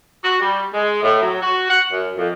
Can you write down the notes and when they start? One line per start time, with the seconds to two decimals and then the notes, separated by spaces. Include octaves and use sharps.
0.24 F#4
0.40 G3
0.74 G#3
1.03 A2
1.22 F#3
1.42 F#4
1.70 F#5
1.91 F#2
2.17 F2